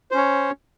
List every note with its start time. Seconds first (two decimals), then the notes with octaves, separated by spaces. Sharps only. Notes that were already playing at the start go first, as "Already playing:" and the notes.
0.11 C5
0.14 C#4
0.17 C#5